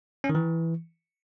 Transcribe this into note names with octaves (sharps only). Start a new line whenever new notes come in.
C#4
D#3
E3